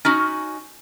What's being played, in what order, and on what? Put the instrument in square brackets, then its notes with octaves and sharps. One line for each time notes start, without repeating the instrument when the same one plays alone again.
[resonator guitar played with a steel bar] C#4 D#4 F#4